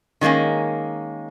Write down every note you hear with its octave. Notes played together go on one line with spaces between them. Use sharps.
D#3 F#3 G#3 A#3 C#4